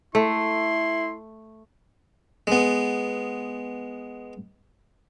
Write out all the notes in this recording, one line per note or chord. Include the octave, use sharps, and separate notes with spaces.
A3 E4 C6
G#3 B3